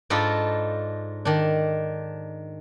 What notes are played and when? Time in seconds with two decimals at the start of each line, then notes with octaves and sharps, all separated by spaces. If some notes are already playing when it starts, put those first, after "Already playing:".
0.10 G#2 D4 D#4 F4 A4 B5
1.25 D#3 D4